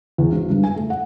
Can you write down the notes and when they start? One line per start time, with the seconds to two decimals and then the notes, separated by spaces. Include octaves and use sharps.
0.18 E2
0.32 G#1
0.50 G2
0.63 G#5
0.76 A3
0.90 F#5